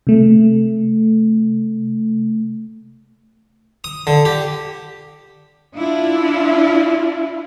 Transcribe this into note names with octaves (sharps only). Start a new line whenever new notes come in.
C3 A3
D#6
D3
G4
D4 E4 F4